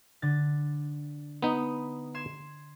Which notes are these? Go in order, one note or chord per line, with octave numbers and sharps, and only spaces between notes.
D3 A6
B3 D#4 B5
C6 G#6 E7